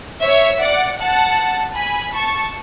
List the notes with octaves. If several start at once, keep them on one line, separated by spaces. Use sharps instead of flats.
C#5 E5
D5 F#5
F#5 A5
G#5 B5
A5 C#6